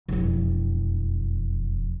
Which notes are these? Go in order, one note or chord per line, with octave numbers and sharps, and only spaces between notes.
E1 F2